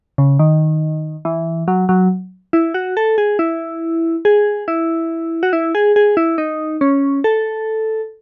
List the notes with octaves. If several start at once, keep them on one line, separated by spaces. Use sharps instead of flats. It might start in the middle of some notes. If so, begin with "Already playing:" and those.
C#3
D#3
E3
F#3
F#3
E4
F#4
A4
G#4
E4
G#4
E4
F#4
E4
G#4
G#4
E4
D#4
C#4
A4